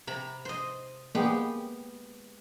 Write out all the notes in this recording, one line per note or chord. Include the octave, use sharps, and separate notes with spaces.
C3 A#5 B5
C5 D#5
G#3 A#3 B3 G4 G#4 G5